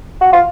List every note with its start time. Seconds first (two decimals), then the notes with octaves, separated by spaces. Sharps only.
0.21 F#4
0.33 F4